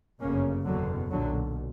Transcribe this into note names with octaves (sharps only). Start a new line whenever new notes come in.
G1 F#2 C#3 A#3 C#4
F#1 E2 B2 D3 F#3
B1 A#2 D3 F#3